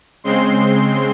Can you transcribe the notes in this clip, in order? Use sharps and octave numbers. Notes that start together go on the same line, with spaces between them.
C#3 G#3 C4 C6